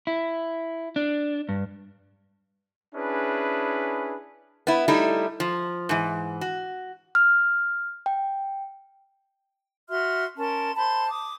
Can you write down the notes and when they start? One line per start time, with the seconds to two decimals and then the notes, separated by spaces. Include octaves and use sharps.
0.07 E4
0.96 D4
1.49 G2
2.95 C#4 D4 E4 G#4 B4
4.67 B3 E4
4.88 G3 A3 D#4 E4
5.40 F3
5.89 G#2 E3
6.41 F#4
7.15 F6
8.06 G5
9.89 F#4 E5 C6 F6
10.38 C#4 A#4 A5 C6
10.76 C5 A5 B5 C6
11.09 D6 D#6